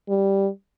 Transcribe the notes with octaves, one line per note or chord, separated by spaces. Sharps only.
G3